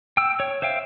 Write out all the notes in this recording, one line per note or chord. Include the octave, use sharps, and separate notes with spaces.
G5 E6
C#5
C5 E5 F5 G5